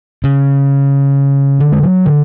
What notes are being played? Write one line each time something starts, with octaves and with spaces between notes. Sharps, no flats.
C#3
D3
G#3
F#3
D3